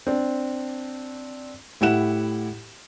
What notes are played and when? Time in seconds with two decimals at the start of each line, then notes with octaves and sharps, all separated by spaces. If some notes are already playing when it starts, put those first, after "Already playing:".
0.07 C4 D4
1.81 A2 E4 G4 F#5 E7